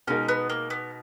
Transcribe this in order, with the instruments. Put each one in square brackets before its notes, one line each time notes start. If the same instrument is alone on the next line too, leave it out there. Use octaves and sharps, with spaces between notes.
[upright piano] B2 G#3 D#4 A#4 [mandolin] C#4
[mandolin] B3
A#3
B3